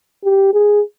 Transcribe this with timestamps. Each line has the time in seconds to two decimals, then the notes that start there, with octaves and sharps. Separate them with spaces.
0.24 G4
0.54 G#4